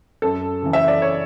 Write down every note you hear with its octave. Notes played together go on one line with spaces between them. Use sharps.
F#2 A4
C#3 E3
E5
D5
C#5